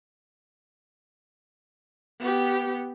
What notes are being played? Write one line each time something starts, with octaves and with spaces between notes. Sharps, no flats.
B3 G4